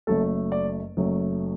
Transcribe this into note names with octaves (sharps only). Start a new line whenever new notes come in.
F#1 F#2 F#3 A3 A4
D5
F#1 F#2 F#3 A3